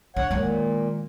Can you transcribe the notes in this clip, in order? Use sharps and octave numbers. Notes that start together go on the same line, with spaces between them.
D3 C#5 F#5
A#2 D#3 G#3